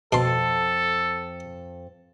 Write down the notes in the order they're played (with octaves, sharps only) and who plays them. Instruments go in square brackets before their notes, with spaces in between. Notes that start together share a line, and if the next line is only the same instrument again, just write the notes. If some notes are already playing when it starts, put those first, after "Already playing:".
[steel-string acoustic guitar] F2 A5 [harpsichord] B2 C6 [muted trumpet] A4